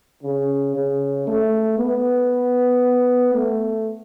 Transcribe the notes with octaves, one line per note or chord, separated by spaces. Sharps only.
C#3
C#3
A3
B3
A3